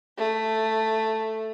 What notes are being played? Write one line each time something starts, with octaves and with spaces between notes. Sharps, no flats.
A3